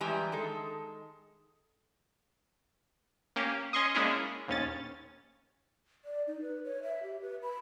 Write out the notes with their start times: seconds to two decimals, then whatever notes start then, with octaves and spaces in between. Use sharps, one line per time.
0.01 E3 G3 G#3 G4 G#5 A#5
0.32 D#3 G#3 A4
3.36 A#3 C#4 G4
3.73 C#4 D#5 C6 C#6 D#6
3.95 G#3 A#3 C#4 D4 E4 G#4
4.48 A#1 D#2 C#4 A6
6.05 D5
6.27 D#4
6.42 B4
6.65 C#5
6.83 E5
7.03 G4
7.22 B4
7.43 B5